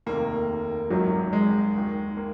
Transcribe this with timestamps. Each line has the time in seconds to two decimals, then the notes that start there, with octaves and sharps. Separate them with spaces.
0.06 F1 D#2 D#3 A#3
0.90 G#1 F#2 D#3 F#3
1.33 G#3
1.75 D#2 D#3
2.17 A#3